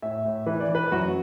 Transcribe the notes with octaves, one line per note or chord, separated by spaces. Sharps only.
A2 E5
A2
E3 B4
D5
E3
B4
F#2 F#4